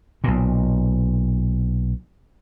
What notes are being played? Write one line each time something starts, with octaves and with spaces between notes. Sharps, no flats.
B1 A#2